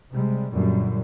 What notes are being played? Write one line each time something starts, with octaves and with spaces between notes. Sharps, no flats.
C3 G3 G#3
F#2 A#2 D3 G3